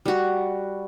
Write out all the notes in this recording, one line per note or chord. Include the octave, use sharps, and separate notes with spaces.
G3 F#4